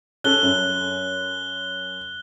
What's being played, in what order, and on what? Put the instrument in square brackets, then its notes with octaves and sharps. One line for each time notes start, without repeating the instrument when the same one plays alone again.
[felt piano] C#4 A4 [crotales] F#6 G7
[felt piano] F#2